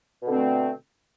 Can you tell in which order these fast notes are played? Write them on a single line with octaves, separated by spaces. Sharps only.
B2 D3 C4 A3